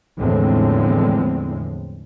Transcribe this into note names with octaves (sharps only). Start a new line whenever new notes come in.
E2 A2 D3 F3 G#3 C4